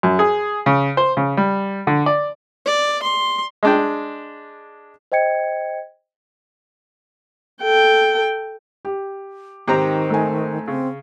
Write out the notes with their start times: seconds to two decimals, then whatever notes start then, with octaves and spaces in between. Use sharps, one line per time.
0.03 F#2
0.19 G#4
0.66 C#3
0.97 C5
1.17 C#3
1.37 G3
1.87 D3
2.06 D5
2.65 D5
3.03 C6
3.63 G#3 D4 G5
5.12 C5 D#5 G5 G#6 C#7
7.63 A4 G5
8.85 G4
9.68 G#2 D#3 C4 G4 A#5
10.10 A3 G#5
10.68 C#3 C4